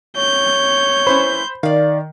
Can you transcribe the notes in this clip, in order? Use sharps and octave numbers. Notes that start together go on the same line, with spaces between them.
C#5 G6
C#4 E4 B4 C5 B5
D#3 D5 F5